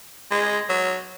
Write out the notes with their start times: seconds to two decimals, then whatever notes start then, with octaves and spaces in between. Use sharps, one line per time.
0.31 G#3
0.69 F#3